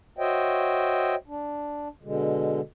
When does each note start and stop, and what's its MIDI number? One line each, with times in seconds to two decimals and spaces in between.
0.18 1.15 66
0.18 1.15 72
0.18 1.15 73
0.18 1.15 75
0.18 1.15 76
0.18 1.15 79
1.28 1.88 62
2.03 2.61 47
2.03 2.61 50
2.03 2.61 56